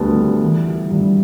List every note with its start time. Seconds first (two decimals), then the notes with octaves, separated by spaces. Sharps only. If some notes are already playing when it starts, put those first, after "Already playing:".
Already playing: D2 D3 G3 B3 A5
0.18 B3
0.42 E3
0.67 G3
0.91 G2